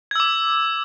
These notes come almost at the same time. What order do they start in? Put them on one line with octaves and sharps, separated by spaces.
G#6 E6 D6